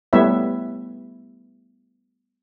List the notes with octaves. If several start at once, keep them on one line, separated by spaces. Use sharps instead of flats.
G3 A3 B3 E4 C#5 E5